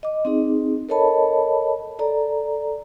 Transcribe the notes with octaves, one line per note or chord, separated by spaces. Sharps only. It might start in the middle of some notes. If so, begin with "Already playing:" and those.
D#5 D6
C4 D#4 G#4
A4 A#4 C#5 D#5 A5 B5
A4 D5 A#5